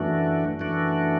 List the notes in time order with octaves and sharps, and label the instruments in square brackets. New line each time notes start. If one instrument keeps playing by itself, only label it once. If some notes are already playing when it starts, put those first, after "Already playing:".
Already playing: [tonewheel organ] F#2 E3 A3 D4 F#4
F#2 E3 A3 D4 F#4